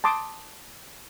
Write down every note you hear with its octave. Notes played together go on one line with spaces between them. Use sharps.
A5 C6 D6 D#6